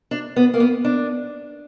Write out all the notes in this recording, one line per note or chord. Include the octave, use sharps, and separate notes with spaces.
D4
B3
A#3
B3
D4